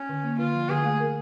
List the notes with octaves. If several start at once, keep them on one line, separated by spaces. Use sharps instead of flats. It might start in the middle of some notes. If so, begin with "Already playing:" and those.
Already playing: C#4
D3
A#3
D3 F4
F3
D3 G#4
A3
A#4